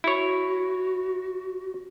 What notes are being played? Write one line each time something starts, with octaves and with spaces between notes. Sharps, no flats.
E4 F#4 C#5